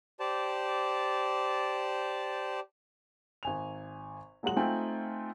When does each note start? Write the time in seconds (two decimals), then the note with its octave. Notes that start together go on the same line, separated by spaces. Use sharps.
0.20 G4 C5 D5 A5
3.43 G#1 G#5 F7
4.43 A#2 F#3 G#3 F#4 F#7
4.57 A3 C4 D#4 F4 G5 G#5